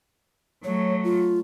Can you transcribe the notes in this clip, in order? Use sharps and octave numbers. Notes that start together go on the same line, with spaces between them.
F#3 A3 C#5
F4